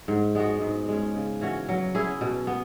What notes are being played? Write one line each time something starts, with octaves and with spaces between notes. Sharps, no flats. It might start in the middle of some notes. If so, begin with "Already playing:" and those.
G#2
G#3 B3 F#4
G#2
G#3 C#4
C#3
E3 C#4 F#4
F#3
C#4 E4 G#4
B2
B3